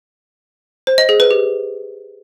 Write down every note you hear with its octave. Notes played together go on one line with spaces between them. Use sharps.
C5
D#5
G#4
B4
G4